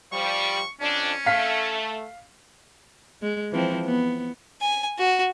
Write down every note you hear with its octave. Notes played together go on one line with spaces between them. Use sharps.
F3 G3 C#6
F2 C#4 D4
A3 F5 B6
G#3
E3 F3 C4
B3
G#5
F#4